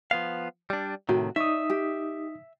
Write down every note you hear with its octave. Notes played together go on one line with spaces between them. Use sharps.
F3 B3 F5
G3 D4
A2 C3 D#3 F#4
D#4 C#5 D5 E5 D#6
G4